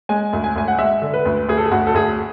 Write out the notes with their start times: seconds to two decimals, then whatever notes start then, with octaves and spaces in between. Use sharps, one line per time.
0.09 G#3 G#5
0.33 D2
0.44 G#5
0.56 D2 G#5
0.68 F#5
0.78 G#3 E5
1.02 D3
1.14 B4
1.25 D2
1.49 D2 G#4
1.58 A4
1.65 G#4
1.71 D2 F#4
1.87 A4
1.94 D2 G#4